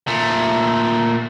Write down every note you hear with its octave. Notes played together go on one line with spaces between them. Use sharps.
A#2 A3